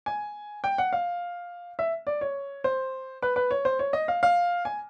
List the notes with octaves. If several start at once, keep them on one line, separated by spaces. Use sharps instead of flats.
G#5
G5
F#5
F5
E5
D5
C#5
C5
B4
B4
C#5
C5
C#5
D#5
F5
F5
G#5